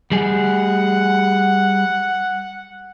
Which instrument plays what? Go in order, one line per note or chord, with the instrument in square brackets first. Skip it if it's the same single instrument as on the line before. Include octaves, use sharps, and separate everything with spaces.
[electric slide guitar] G3 G#4 [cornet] F#5